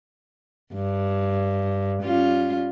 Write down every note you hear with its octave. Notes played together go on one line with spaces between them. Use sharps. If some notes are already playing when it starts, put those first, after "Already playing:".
G2
G3 C#4 F4